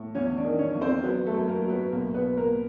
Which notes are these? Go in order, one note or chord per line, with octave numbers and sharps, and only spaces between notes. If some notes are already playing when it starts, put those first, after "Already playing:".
Already playing: A2
E2 C#4 C#5
D4 D5
D#3
C#4 C#5
E2
C4 C5
F#3 B3 B4
A3 A4
F#2
A#3 A#4
F#3
B3 B4
B1 A#3 A#4
B3 B4
B1
A#3 A#4